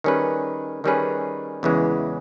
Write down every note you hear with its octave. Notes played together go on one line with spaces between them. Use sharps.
D#3 G3 C#4 G#4 B4
D#3 G3 C#4 G#4 B4
E2 C#3 E3 G#3